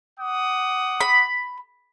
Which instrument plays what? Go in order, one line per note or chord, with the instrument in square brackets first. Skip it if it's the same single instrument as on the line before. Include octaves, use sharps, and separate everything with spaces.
[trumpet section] F#5 D6 D#6
[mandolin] B5